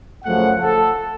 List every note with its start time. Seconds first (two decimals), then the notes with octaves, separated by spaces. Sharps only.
0.23 F#2 C#3 F3 A3 F#5
0.61 A4